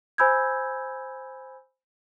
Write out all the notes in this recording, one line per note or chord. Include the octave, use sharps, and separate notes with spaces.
C5 G#5 B5 E6 G6 G#6